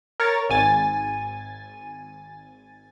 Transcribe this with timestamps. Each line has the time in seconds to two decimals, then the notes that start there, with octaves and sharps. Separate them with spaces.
0.20 A#4 C#5 C#6 A6
0.50 G#1 G#5 A6